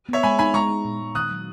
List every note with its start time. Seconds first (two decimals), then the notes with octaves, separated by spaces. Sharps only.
0.09 B3 C#5 E5
0.23 G#3 G#5 B5
0.39 D#4 G#5 B5
0.54 G#3 A#5 C#6
0.69 D#4
0.85 A#2
1.01 G#3
1.15 D#3 D#6 F#6
1.31 F#3